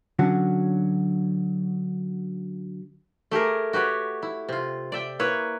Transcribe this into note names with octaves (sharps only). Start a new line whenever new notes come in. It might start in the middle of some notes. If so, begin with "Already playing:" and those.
D3 F#3 C#4 F#4
A3 G4 G#4 A#4
F#4 G4 B4 C#5
E4
C3 F4
D5 E5 G5
A#3 E4 B4 C#5